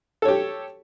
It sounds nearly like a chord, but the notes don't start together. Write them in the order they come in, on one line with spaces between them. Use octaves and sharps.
A4 C#5 G4